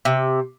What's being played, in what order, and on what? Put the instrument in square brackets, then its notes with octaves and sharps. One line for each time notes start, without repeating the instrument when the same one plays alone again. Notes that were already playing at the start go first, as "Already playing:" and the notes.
[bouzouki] C3